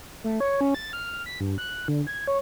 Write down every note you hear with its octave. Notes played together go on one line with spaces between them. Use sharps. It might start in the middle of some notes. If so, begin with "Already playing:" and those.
A3
C#5
C#4
A6
F6
B6
G2
F#6
D3
G#6
C#5